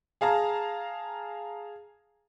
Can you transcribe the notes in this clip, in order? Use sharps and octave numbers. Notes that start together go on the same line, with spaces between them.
G#4 F5 A5 A#5